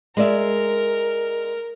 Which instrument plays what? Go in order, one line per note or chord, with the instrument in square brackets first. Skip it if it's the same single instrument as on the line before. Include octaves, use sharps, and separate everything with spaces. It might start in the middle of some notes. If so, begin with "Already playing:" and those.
[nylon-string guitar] G#3 D5 E5 [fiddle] A#4